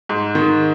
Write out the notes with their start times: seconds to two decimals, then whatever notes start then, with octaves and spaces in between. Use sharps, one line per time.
0.09 G#2
0.35 D#3